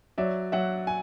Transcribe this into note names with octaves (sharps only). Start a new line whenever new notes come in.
F#3 D5 E5
F#3 E5 F#5
G#5